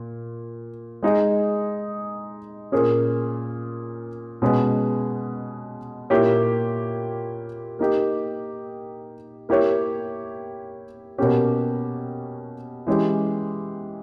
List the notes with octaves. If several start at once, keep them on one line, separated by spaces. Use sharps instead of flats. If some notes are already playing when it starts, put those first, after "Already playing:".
Already playing: A#2
G#3 D#4 G#4
A#2 A#3 C#4 G#4
B2 G#3 C#4 G#4 B4
A#2 A#3 E4 G4 C#5
A#3 D#4 G4
A#3 E4 G4 C#5
B2 A#3 C#4 G4 C#5
E3 G#3 C#4 G4